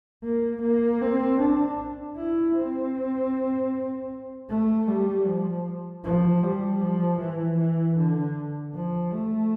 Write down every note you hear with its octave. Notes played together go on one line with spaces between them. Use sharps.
A#3
A#3
C4
D4
E4
C4
A3
G3
F3
F3
G3
F3
E3
E3
D3
F3
A3